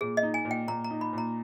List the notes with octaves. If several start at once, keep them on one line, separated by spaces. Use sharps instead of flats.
A#2 G#4
D#5
D#4
G#5
A#2
G5
A#2 A#5
A#5
D#4
B5
A#2 A#5